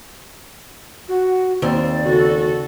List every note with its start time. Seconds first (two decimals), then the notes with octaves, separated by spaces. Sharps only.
1.08 F#4
1.62 D#2 C4 D5
2.03 C#3 F#4 A4